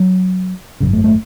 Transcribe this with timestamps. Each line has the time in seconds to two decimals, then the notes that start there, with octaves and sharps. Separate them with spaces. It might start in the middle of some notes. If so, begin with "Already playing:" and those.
Already playing: F#3
0.80 G#1 F#2 C#3
0.93 A3
1.04 A3